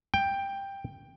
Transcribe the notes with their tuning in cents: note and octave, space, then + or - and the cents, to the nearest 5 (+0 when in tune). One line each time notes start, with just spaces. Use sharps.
G5 +10